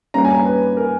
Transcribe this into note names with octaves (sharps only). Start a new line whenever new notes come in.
G2 G3 A#3 C#4 A#5
G#5
A#5
B4
A#4